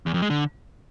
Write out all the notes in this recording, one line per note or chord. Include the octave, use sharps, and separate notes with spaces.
E2
F2
G#3
D3